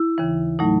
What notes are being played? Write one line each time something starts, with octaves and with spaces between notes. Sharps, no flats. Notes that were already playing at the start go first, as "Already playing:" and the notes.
Already playing: E4
D#2 C#3 E3
A2 F#3 A3 D#4